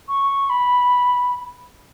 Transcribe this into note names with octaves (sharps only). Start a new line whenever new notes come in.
C#6
B5